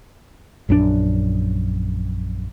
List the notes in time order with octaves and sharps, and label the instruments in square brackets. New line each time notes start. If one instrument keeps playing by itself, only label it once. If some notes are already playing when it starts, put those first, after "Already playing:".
[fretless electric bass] A#1 F#2 D3 D4